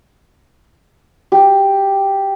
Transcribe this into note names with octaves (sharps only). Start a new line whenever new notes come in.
G4